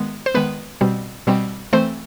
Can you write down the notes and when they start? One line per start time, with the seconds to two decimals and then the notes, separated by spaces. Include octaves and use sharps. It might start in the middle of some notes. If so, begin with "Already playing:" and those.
Already playing: D#3 G#3 B3
0.26 C5
0.35 D#3 G#3 B3 B4
0.81 B2 G3 C4
1.27 B2 G3 C4
1.73 E3 A3 C4 C5